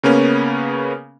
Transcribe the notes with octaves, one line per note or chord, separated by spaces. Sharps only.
C#3 A#3 B3 C#4